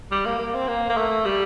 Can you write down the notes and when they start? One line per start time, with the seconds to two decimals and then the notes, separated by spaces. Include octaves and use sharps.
0.11 G3
0.26 A#3
0.39 A#3
0.54 C4
0.68 A#3
0.89 A#3
0.97 A3
1.25 G3